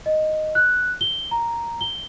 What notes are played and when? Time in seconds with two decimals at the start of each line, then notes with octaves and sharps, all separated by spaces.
0.06 D#5
0.55 F#6
1.01 G7
1.31 A#5
1.81 G7